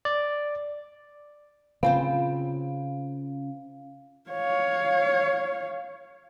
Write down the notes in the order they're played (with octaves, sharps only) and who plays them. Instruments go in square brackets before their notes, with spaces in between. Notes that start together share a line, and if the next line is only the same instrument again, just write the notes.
[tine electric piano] D5
[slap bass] C#3 [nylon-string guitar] C4 F4 C5 [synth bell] F5
[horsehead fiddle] C#5 F5